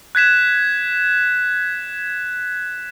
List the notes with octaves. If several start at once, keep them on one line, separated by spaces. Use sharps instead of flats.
F#6 G#6 B6 E7